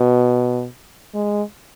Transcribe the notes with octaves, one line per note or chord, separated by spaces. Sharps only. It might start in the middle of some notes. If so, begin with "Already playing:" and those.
Already playing: B2
G#3